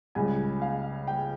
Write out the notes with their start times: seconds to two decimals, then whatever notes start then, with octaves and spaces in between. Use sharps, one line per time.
0.15 C#2 C#3 G3 G#5
0.62 F5
1.07 G5